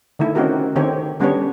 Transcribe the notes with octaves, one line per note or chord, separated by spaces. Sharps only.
D3 D#3 A3 E4
C4 C#4 D#4 F#4 G4 A#4
D3 D#3 C4 G4 C#5
D3 G3 B3 C#4 D4 C#5